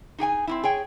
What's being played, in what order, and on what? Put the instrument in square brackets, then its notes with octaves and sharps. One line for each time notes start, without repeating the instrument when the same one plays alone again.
[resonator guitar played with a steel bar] D#4 G#4 G5 G#5
C4 C#4 E4
G#4 C#5 G5